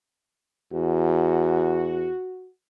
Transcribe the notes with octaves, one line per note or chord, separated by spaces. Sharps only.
E2 F#4